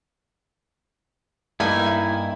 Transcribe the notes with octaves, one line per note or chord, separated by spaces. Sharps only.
G2 A#3 D#4 E4 G#5